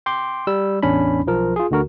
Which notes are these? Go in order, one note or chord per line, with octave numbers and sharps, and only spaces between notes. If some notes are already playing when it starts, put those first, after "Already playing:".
G5 C6 D6
G3 E6
A1 E2 C#4 D4 B5
B1 F3 A#4
F4 G#4
D2 D3 F#4 A#4